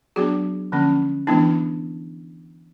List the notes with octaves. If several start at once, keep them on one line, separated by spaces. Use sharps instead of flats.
F#3 B3 D4 F#4 G#4
D3 F3 A#3 C#4
E3 G#3 B3 D4 E4